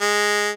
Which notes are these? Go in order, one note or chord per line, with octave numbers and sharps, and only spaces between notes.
G#3